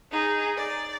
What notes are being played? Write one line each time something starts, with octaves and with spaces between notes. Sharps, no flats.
D#4 G#4
D5